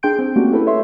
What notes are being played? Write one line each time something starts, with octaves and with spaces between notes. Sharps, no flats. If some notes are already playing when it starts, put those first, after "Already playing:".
D4 G#4 G5 C6 G6 D7
C4
A3 A#3 C#4 D4 F#4 G4
E4 A4 B4
C#5 E5 C6